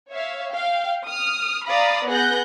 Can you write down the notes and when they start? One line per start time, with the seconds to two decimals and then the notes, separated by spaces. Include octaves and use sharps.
0.12 C#5 E5 F5
0.54 F5 G5
1.07 D#6 F6
1.67 D5 F5 A#5 B5 D#6
2.10 B3 G#4 F#6 G6 A#6